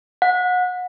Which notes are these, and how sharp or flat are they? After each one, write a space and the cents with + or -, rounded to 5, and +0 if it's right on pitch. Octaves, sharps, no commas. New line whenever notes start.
F#5 -30